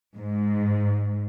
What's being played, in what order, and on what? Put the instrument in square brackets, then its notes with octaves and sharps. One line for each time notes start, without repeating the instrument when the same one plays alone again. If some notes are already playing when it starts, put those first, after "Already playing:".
[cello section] G#2